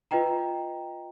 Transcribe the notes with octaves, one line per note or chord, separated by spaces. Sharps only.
F4 B4 D#5 G5 A#5